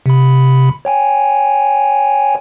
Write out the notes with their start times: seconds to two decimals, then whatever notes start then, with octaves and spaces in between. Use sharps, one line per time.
0.06 C3 B5
0.85 C#5 G5 G#5